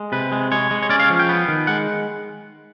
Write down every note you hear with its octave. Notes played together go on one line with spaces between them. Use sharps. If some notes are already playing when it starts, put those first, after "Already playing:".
Already playing: G#3
C3 B4
G#3
G#3 C#5
G#3
C#5
C#4 D5
F5
F3
G5
B3
D#3
G#3 F#5